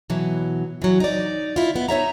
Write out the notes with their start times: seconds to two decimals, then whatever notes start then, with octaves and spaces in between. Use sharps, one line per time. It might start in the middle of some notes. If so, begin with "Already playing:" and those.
0.10 B2 E3 F#3
0.82 E3 F#3
1.00 D#4 D5
1.56 E4 F4
1.76 B3
1.89 D#4 C#5 E5 A#5